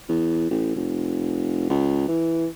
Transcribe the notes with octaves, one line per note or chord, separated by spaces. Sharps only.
E2
A1
F1
C#2
E3